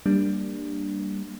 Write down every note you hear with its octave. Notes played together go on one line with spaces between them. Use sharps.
G3 A#3 D4